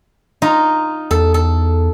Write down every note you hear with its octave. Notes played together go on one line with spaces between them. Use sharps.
D#4 F4 A#5
E2 A4
A4